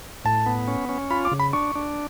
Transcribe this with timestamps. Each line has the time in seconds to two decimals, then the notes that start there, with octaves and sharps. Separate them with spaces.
0.25 A2 A5
0.46 B3
0.68 C#4
0.89 C#4
1.11 F4 B5
1.25 D6
1.32 C#3
1.40 B5
1.53 D4 C#6
1.75 D4